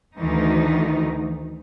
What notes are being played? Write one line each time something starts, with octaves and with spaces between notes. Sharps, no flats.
D2 D#3 E3 D#4